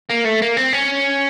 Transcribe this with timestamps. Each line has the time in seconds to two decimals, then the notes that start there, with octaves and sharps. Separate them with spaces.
0.10 A#3
0.25 A3
0.42 A#3
0.57 C4
0.73 C#4